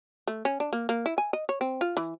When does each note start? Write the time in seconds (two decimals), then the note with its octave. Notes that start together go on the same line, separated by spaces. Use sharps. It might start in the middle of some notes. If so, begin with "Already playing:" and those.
0.28 A3
0.45 C#4
0.60 D4
0.73 A#3
0.89 A#3
1.06 E4
1.18 G#5
1.33 D#5
1.49 C#5
1.61 C4
1.81 F4
1.97 E3